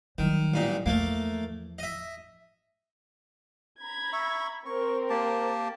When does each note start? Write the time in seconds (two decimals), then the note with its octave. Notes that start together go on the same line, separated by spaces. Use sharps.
0.18 D#3 F#3 G3
0.54 A1 A#2 D#4
0.86 E2 F3 A3 A#3
1.79 D#5 E5
3.80 A#5 B5 G#6
4.13 E5 C#6
4.66 C4 A#4 C#6
5.10 A#3 G4 A5